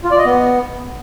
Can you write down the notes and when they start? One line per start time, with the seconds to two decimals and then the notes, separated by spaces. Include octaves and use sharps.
0.04 F4
0.11 D5
0.18 D#5
0.26 B3